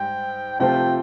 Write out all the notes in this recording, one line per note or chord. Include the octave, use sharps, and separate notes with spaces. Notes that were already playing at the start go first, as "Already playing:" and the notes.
Already playing: G#2 G3 G5
C3 F3 A3 C4 F4 G5